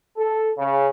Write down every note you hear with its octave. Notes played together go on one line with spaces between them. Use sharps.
A4
C#3